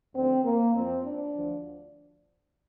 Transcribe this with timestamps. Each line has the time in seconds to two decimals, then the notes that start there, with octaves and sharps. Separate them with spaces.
0.15 D2 D3 F3 C4
0.44 A#3
0.74 F2 F3 C4
1.05 D4
1.35 D2 D3 F3